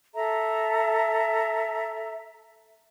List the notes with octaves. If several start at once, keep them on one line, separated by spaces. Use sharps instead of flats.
A4 E5 A#5